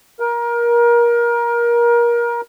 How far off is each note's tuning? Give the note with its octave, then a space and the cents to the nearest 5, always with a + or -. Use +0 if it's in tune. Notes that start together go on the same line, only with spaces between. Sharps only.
A#4 +25